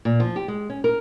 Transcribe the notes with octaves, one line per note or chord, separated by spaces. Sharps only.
A#2
F3
G4
G#3
C#4
A#4